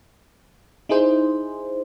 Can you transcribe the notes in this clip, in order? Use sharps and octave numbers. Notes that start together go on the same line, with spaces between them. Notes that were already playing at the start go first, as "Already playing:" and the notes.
D#4 E4 G#4 C5